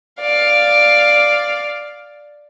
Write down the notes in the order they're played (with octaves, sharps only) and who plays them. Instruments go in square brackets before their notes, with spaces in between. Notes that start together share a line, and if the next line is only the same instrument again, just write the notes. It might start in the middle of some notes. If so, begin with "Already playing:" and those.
[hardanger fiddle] D5 F5